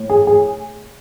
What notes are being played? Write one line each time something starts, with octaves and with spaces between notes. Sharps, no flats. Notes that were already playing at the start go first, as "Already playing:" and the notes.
Already playing: A2
G#4
G#4